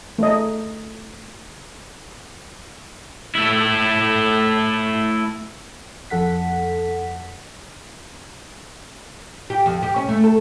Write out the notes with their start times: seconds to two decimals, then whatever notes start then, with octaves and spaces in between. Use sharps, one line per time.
0.18 A3 D#5
3.35 A3 E4
6.10 F2 A4 F#5 B6
9.50 G4
9.66 F2
9.82 G4
9.96 C#4
10.09 A3
10.24 A4